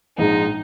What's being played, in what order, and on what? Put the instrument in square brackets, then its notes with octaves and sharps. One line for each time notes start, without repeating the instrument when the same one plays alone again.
[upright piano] A#1 G#2 G#3 [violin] D#4